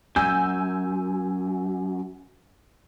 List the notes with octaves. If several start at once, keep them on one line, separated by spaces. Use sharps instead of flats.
F#2 G#5 E6 G6